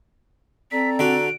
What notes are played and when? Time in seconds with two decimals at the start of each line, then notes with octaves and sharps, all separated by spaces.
0.72 C4 A4 D5 A#5 B6
0.99 D3 F#4 D7